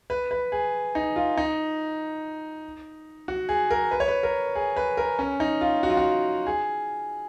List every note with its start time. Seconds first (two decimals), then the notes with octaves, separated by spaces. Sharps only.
0.10 B4
0.31 B4
0.52 G#4
0.95 D#4
1.16 F4
1.37 D#4
3.28 F#4
3.49 G#4
3.70 A#4
3.91 B4
4.00 C#5
4.08 B4
4.23 A#4
4.55 G#4
4.76 B4
4.97 A#4
5.19 C#4
5.40 D#4
5.61 F4
5.83 F#4
5.90 F4
5.97 F#4
6.47 G#4